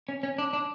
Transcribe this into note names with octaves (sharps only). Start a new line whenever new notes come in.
C#4
C#4
D4
D4